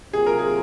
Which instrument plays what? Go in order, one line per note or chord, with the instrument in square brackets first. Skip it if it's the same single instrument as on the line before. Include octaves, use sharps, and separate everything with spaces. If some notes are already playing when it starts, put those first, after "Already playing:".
[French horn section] C3 F#3 A#3 F4 [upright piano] G#4
[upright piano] A#4
G#4